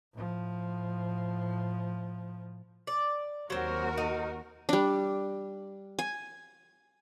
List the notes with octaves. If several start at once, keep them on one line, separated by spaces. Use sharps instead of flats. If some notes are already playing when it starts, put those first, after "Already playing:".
A2 F3
D5
D#2 F#3 C4 F#4 A#4
D#4
G3 D4
G#5